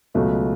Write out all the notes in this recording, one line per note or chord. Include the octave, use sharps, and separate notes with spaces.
C#2 B2 F#3 A3